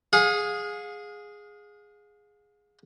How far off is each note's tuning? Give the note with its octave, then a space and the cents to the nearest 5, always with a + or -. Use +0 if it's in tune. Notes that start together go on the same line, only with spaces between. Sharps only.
G#4 +0 F5 +40